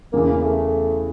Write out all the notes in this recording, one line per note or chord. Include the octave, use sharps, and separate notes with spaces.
E2 C#3 E3 A#3
A3